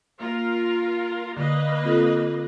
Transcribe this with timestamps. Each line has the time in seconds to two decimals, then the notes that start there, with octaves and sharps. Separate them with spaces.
0.20 A#3 F4 A#4
1.37 D3 A#3 B4 D#5
1.84 C4 F4 A4